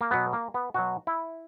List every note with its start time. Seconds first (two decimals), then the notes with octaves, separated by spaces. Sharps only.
0.01 A#3
0.11 B2 F#3 B3
0.33 A#3
0.54 B3
0.74 B2 F#3 F#4
1.07 E4